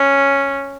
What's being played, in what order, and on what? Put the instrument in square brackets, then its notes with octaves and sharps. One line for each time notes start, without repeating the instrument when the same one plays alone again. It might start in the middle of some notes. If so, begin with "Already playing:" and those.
Already playing: [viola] C#4